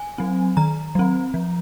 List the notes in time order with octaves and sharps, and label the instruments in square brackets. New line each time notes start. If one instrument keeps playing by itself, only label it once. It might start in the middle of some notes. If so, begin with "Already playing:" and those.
Already playing: [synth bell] G#5
F#3 C4
D#3 A#5
F#3 C4
F3